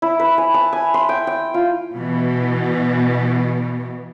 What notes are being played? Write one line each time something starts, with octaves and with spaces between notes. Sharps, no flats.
E4
B4
G#5
A5
G#5
C6
G5
G5
F4
B2 E3